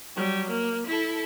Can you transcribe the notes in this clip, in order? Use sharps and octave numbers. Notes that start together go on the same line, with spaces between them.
F#3 G3
A#3
E4 A4